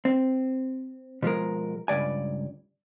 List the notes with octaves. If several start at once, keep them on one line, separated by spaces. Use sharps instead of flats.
C4
B2 F3 G#3 A#4
C#2 G2 C#3 D5 G#5